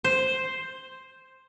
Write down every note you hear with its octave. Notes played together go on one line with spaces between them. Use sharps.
C5